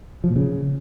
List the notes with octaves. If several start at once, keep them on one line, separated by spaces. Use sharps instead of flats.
F3
A#2
C#3